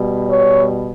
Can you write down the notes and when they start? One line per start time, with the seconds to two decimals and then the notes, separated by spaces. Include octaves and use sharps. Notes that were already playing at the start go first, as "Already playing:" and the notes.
Already playing: B2 G3
0.28 C#5